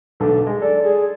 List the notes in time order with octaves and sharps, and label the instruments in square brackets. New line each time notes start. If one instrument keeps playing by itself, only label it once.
[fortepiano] B1 D3 A3
G#3
[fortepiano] A4 [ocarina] D5
[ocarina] G#4